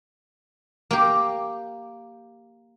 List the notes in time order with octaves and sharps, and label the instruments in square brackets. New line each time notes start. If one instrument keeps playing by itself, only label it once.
[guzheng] A#3 G4